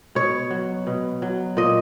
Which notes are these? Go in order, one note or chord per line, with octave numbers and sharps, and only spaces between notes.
B2 C#5
F#3
B2
F#3
A#2 D#5